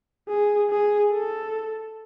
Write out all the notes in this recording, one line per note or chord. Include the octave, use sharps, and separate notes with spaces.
G#4
G#4
A4